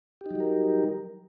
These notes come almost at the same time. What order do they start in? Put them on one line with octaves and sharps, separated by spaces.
G4 D#4 F#3 G3 A#4